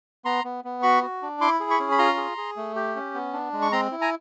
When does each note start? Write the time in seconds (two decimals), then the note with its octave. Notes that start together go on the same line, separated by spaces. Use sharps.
0.25 B3 A#5 C6
0.44 B3
0.64 B3
0.83 F#4 B5 C#6
1.03 F#4
1.22 D4
1.41 E4 C6 D6
1.60 G#4
1.70 B5 C#6
1.80 C#4
1.92 B5
1.99 F4 A#5 C6
2.18 G#4
2.37 G#4
2.56 A3
2.75 G4
2.96 C#4
3.14 B3
3.33 D4
3.53 G#3
3.62 C#6
3.72 C4 A#5 C6
3.91 E4
4.01 G#5 A#5